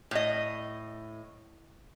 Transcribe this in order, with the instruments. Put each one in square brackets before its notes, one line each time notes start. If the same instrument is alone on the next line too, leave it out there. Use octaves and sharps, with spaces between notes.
[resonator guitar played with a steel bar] A2 D#5